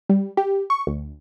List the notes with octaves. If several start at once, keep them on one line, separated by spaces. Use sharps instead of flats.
G3
G4
C#6
D2